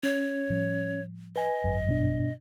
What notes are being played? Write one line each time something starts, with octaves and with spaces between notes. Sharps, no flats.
C#4 C#5
A2 F3 G3
B4 D#5 G#5
G#1 F#2
G2 B2 D4